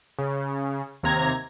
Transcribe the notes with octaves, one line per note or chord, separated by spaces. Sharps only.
C#3
D#2 C3 A#5 G#6